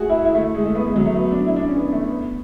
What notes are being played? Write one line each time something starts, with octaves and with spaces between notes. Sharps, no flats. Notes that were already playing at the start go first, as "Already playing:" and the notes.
Already playing: A3 F#4 G#4
E4
E4
A3
G#3
A3
B3
G#3
F#3
A3
B3
D4
E4
D4
C#4
B3
A3
B3